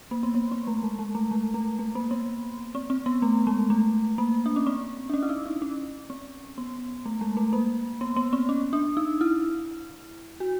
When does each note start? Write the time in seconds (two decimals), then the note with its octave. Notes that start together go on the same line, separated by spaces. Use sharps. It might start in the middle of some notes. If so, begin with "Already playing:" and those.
0.11 A#3
0.23 B3
0.35 B3
0.51 C4
0.67 A3
0.83 G#3
0.99 G#3
1.15 A3
1.31 G#3
1.54 A3
1.79 A3
1.95 A#3
2.11 B3
2.75 C4
2.90 C4
3.06 B3
3.22 A3
3.47 G#3
3.70 A3
4.18 A#3
4.46 D4
4.56 C#4
4.67 C4
5.09 D4
5.14 C#4
5.22 E4
5.29 D#4
5.46 D#4
5.62 C#4
6.10 C4
6.58 B3
7.05 A3
7.21 G#3
7.37 A3
7.53 A#3
8.01 B3
8.16 B3
8.33 C4
8.49 C#4
8.73 D4
8.97 D#4
9.21 E4
10.40 F#4